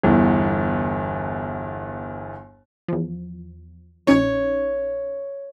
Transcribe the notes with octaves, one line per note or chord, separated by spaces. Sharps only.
G1 E2
E2 F3
A#1 C#4 D#4 C#5